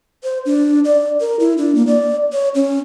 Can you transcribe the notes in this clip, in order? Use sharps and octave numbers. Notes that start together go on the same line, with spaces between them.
C5
D4
D5
A#4
E4
D4
A#3
D5
C#5
C#4